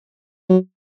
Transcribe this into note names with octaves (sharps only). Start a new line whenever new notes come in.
F#3